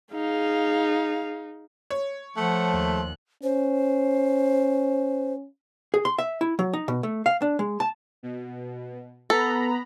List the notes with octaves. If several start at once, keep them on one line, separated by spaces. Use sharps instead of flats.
D#4 G#4 F5
C#5
F3 A3 F#5
D#2 F#6
C#4 C5
G#4
C6
E5
E4
F#3
D#4
B2
A3
F5
D4
G#3
A5
B2
B3 A4 A#5 B5